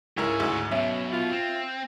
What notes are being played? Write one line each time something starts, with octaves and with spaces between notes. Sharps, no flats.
C#2 G#2 E4 G#4 A#4 C#5
D2 G#2
B1 B2 C#4 E5
F4
C4